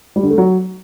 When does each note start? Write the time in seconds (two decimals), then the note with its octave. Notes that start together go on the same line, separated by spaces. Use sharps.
0.16 G3
0.23 D3
0.31 A3
0.38 F#3